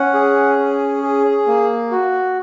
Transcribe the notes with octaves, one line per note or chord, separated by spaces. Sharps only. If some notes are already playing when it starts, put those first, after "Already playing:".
Already playing: C#4 F#5
G#4
C#4
G#4
A#3
F#4